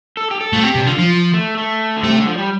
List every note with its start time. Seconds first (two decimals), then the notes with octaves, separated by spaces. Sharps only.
0.17 A4
0.31 G4
0.41 A4
0.53 A3 F4
0.63 C4 G4
0.75 C3
0.78 D4
0.86 D3 F4
0.98 F3
1.34 A3
1.57 A3
1.97 D3
2.04 C3 A3
2.16 D3
2.27 F3
2.38 G3